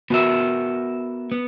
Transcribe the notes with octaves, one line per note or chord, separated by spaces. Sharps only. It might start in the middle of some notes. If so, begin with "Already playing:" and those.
B3 F#4 A#4 E5
B3